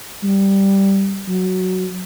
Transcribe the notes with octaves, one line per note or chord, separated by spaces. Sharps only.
G3
F#3